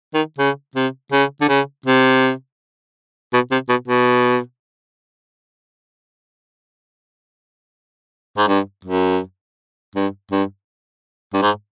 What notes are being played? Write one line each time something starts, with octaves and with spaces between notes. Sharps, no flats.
D#3
C#3
C3
C#3
D3
C#3
C3
B2
C3
B2
B2
G#2
G2
F#2
G2
G2
G2
G#2